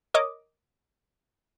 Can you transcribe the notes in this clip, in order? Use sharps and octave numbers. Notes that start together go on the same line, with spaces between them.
A#4 C#5 D#5 D6 D#6